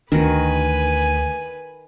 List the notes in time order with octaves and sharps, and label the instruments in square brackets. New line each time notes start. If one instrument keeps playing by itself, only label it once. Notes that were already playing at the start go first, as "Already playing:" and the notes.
[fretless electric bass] D2 D4 [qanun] D#3 F#4 [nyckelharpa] B4 G#5